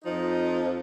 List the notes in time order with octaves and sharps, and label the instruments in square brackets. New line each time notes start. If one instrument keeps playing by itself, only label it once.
[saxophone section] F2 F3 D#4